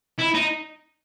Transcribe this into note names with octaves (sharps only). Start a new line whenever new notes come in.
E4
D#4